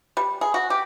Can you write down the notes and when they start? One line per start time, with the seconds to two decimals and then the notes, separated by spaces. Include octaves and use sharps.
0.17 G3
0.41 G#4
0.54 F#4
0.70 G4